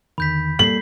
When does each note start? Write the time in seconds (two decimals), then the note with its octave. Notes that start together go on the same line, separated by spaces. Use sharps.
0.18 E2 D3 D#3 B5 G6 B6
0.59 G3 A#3 A4 B6 C7 F#7